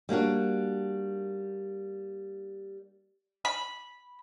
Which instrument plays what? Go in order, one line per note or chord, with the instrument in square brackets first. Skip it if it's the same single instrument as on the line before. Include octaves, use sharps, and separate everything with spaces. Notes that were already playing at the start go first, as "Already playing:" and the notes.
[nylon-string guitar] G3 A#3 D4 F#4
[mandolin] B5